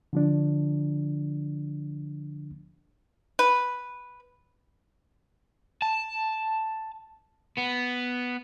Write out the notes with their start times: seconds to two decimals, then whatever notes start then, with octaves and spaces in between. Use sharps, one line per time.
0.13 D3 F3 D4
3.39 B4
5.82 A5
7.58 B3